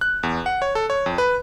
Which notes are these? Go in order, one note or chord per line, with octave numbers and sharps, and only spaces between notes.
F#6
E2
F#5
C#5
A4
C#5
F2
B4